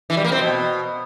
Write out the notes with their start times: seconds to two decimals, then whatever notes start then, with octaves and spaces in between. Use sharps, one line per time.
0.10 E3
0.17 G3
0.24 A#3
0.32 C4
0.39 B2